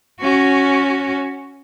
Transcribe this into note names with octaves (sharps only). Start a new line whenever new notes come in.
C#4 F#4